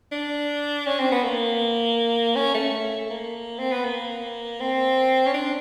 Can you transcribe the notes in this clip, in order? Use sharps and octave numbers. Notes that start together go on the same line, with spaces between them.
D4
C#4
C4
B3
A#3
C#4
A3
A#3
C4
B3
A#3
C4
C#4
D4